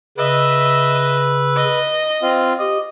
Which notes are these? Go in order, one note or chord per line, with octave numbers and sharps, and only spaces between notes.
C#3 B4 D#5 E5 E6
D#5
C4 F4
G4 D#5